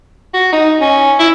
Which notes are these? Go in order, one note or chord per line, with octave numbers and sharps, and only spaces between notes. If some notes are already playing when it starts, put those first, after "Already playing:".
F#4
D#4
C#4
E4